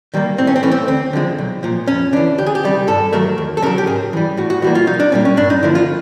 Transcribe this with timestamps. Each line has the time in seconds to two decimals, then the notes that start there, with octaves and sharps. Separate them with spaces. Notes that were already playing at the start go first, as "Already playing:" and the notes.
0.14 D#3 G3 A#3
0.38 A2 C4
0.47 C#4
0.56 C4
0.63 E3 A3 C#4
0.72 C4
0.88 D2 C4
1.13 D3 F3 G#3
1.38 B1
1.63 A#2 F3
1.87 F2 C#4
2.13 C#3 E3 D4
2.38 D2 G4
2.46 G#4
2.55 G4
2.63 C3 D#3 G3
2.88 G2 A4
3.13 D#3 F#3 A3 A#4
3.38 D#2
3.57 A4
3.62 C#3 F#3 A#4
3.78 G4
3.87 G#2 G#4
4.13 E3 G3
4.37 A2 F#4
4.50 F#4
4.62 E3 G3 A#3 F#4
4.75 F4
4.87 B1 D#4
5.00 D4
5.12 A#2 G3 A#3 C#4
5.25 C#4
5.37 G2 D4
5.50 D#4
5.63 D3 F3 A#3 E4
5.75 F4